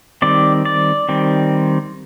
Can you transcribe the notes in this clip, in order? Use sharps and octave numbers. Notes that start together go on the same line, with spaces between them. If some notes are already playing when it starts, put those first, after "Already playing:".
D#3 G3 C4 D5
D5
D#3 G3 C4